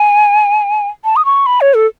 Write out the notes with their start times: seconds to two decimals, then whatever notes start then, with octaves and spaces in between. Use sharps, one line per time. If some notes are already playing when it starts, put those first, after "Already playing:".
Already playing: G#5
1.05 A5
1.16 D#6
1.25 C#6
1.46 B5
1.61 C#5
1.74 A4